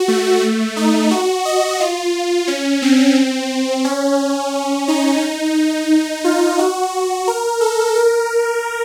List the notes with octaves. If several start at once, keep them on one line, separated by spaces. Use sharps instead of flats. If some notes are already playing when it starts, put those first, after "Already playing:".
Already playing: F#4
A3
D#4
F#4
D#5
F4
C#4
C4
C#4
D#4
F4
F#4
A#4
A4
A#4